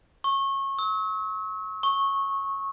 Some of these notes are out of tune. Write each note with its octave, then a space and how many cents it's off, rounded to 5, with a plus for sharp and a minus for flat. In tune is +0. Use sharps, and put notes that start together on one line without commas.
C#6 -25
E6 -40
C#6 -15